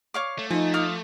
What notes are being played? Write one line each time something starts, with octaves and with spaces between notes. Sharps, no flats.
C#5 F5 D6
A3
F3 D#4 G#5
F5 D6 D#6